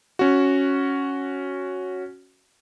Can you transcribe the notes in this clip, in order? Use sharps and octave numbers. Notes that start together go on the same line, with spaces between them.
C#4 F#4